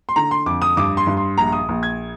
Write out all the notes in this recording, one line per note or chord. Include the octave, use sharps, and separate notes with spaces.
C6
D3 A#5
C6
F2 D6
D#6
G2 D6
C6
G2
C6
A#1 A#5
D#6
A#1
G#6